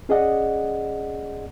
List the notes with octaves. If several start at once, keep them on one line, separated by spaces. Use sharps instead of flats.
C#4 G#4 D5 D#5 F#5